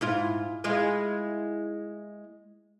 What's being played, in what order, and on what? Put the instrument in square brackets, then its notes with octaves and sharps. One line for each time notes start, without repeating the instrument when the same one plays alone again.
[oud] G#2 E4 F4
G#3 E4 F4